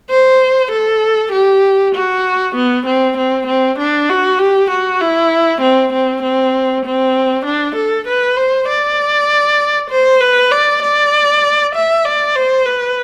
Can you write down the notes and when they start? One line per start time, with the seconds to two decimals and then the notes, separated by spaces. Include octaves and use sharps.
0.10 C5
0.71 A4
1.33 G4
1.95 F#4
2.55 B3
2.86 C4
3.17 C4
3.47 C4
3.79 D4
4.09 F#4
4.39 G4
4.70 F#4
5.01 E4
5.61 C4
5.93 C4
6.23 C4
6.85 C4
7.45 D4
7.76 A4
8.07 B4
8.37 C5
8.68 D5
9.90 C5
10.21 B4
10.51 D5
10.83 D5
11.75 E5
12.05 D5
12.36 C5
12.66 B4